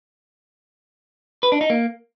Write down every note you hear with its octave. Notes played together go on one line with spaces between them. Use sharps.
B4
D4
D#4
A#3